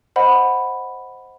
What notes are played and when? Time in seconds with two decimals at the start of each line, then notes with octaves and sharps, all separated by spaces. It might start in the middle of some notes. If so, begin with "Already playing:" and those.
0.16 C5 D#5 F#5 B5